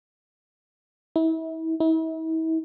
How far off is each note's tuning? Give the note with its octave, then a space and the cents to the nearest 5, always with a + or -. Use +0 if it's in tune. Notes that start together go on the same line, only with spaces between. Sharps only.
E4 -35
E4 -40